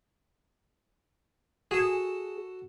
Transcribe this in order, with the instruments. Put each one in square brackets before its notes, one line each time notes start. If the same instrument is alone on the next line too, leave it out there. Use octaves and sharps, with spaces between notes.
[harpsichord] F#4 A4 [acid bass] G#4